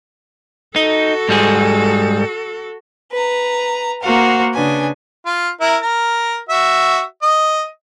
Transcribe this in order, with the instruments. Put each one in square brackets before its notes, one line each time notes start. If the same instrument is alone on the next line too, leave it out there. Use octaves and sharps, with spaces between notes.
[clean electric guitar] D#4 [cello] F#4 A4
[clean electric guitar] G#2 G3 G#4
[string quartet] B4 A#5
A#3 F#4 A#4 C5 F5 F#5
C#3 D4 B4 G#5
[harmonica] F4
E4 A#4
A#4
F#4 E5
D#5